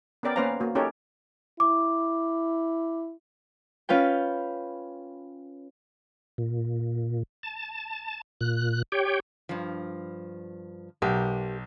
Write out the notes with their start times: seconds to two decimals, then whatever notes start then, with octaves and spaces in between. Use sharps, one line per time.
0.23 B3 C#4 A#4 D5 G5
0.36 A#3 C#4 B4 C5 F5 A#5
0.60 A#3 F#4
0.75 C#4 D#4 G4 A4 A#4 C#5
1.60 E4 D6
3.89 C#4 F4 B4 G5
6.38 A#2
7.43 A5
8.41 A#2 F#6
8.92 G4 C#5 G5
9.49 G2 F3
11.02 B1 G4 A#4